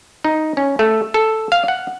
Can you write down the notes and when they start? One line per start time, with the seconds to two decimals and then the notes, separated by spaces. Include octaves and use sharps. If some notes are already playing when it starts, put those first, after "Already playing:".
0.24 D#4
0.57 C#4
0.79 A3
1.14 A4
1.52 F5
1.68 F#5